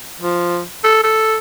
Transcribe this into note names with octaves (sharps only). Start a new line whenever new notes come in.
F3
A4
A4